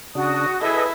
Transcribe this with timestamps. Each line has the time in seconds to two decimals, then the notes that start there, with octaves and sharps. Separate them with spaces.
0.15 C#3 D4 F#4 D#6
0.62 E4 G#4 A4 B4 D#5